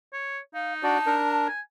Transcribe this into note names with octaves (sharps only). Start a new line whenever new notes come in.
C#5
D#4 F5
D4 F#4 D5 A5
D4 A#4
G#5